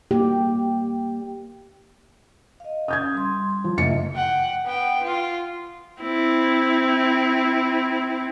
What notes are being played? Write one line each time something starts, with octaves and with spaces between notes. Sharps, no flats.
A#3 G4
D#5 F5
C#4 D#6 G6 G#6
G3 C6
F3
F#1 A3 D#5 E5 C#7
F#5 G5
B3 G5
F4
C4 E4